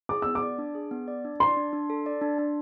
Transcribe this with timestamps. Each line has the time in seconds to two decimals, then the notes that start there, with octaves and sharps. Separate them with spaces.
0.09 G#4 D6
0.22 B3 E6
0.35 D6
0.42 D5
0.58 D4
0.75 G#4
0.91 B3
1.08 D5
1.25 D4
1.40 D5 C6
1.57 D4
1.73 D4
1.90 A4
2.06 D5
2.21 D4
2.39 D4